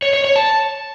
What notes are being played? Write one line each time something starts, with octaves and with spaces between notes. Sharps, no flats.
C#5
C#5
C#5
A5